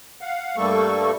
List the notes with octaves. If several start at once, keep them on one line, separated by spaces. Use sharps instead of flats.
F5 F#5
G2 G3 A3 A#3 A4 C#6